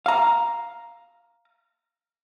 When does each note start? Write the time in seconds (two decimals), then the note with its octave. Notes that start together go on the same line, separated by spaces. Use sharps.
0.06 F5 A#5